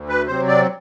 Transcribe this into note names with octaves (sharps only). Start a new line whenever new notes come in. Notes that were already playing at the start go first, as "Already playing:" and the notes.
Already playing: D2
B4
C3 F#3 C4 C5
D5